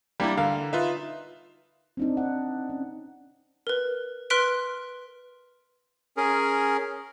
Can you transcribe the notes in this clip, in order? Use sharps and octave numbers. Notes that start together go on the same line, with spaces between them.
G3 A#3 D4 E4 A#4
D3 A#4 F5
D#4 F4 B4 E5
C4 D4 D#4
F#5
C#4
A#4 B4
B4 C6 F6 F#6 B6 D7
C#4 G#4 A#4